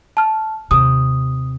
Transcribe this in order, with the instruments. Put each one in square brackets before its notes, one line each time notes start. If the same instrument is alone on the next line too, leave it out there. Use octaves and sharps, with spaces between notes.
[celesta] A5 F6
[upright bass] D#2 C3 [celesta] D#6